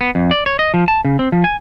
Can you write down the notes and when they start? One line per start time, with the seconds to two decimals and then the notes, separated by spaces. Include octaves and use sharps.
0.01 B3
0.15 F2
0.31 D5
0.46 C#5
0.59 D#5
0.74 F3
0.88 A5
1.05 C#3
1.19 C4
1.32 F3
1.44 G#5